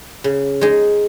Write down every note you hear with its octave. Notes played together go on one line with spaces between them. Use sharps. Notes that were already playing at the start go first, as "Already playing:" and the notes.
C#3
G#3 D#4 G#4